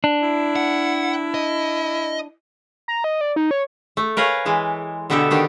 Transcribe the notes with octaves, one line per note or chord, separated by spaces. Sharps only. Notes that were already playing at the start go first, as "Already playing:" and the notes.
D4
E4
F#5
D#5
A#5
D#5
D5
D#4
C#5
A3
A#4 B4 C#5 F5 G#5
E3 G#3
B2 D3 B3 G4 A4 E5
B2 D#3 D4 G4